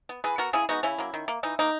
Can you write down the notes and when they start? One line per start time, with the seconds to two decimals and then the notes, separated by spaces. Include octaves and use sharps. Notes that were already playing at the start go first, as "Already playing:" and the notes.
0.09 B3
0.24 E3 G#4 B4
0.38 B3 F#4 A#4
0.53 C#3 E4 G#4
0.69 G#3 B3 D#4 F#4
0.83 C#3 C#4 E4
0.98 F#3 A#3
1.14 D#3
1.28 A#3
1.43 E3 D#4
1.59 A#3 D#4